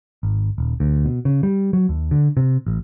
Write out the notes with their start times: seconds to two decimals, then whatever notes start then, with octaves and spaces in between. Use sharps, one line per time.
0.23 G#1
0.58 D#1
0.80 D2
1.05 B2
1.25 C#3
1.43 G3
1.73 F#3
1.89 D#2
2.11 D3
2.37 C3
2.67 A1